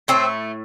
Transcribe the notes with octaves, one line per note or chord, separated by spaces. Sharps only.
A2 A3 C4